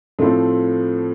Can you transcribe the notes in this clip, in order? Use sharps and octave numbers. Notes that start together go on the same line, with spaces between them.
A2 F3 A3 C4